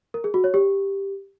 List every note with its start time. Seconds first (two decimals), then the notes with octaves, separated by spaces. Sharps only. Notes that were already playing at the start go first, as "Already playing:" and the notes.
0.14 A#4
0.24 G#4
0.34 F#4
0.44 C#5
0.54 G4